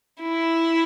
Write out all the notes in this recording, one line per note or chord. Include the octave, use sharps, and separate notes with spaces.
E4